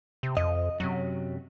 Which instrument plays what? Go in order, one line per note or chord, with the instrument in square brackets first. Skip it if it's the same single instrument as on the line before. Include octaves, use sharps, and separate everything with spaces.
[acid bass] C3
[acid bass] F2 [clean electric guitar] D#5
[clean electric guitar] F#2 C3 [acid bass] F#3